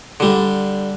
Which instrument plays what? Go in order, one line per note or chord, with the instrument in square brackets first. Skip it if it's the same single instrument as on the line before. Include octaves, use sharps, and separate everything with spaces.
[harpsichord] D3 G3